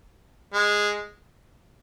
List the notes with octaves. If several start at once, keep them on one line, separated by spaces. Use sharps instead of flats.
G#3